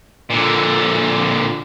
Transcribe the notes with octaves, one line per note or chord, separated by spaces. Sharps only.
A#2 D3